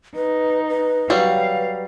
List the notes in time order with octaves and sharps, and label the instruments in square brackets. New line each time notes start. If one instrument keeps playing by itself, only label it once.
[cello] D#4 [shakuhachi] B4
[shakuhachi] B4
[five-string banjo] F#3 G3 [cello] F5